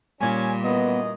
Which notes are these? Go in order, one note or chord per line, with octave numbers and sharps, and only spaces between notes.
A#2 G3 C#4 G#5
F#2 E3 B3 D#5